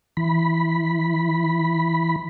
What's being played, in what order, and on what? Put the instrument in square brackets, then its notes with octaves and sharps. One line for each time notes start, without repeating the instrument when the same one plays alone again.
[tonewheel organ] E3 B5